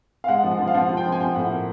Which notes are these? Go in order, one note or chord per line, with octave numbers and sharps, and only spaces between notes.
F5
G#3 F#5
F3
F#5
F3
F5
F3 F#5
F3
G5
F3
G#5
F3 G5
A2 F#5
A#3